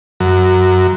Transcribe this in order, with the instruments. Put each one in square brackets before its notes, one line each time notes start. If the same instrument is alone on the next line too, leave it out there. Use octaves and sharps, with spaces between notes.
[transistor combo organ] F#2